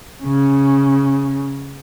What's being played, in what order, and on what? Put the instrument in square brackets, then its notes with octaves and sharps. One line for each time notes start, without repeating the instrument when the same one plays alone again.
[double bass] C#3 C#4